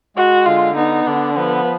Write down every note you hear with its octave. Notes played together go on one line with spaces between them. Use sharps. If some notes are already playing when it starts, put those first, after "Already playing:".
G#3 F#4
D3 F4
B3 D#4
D3 D4
F3 B3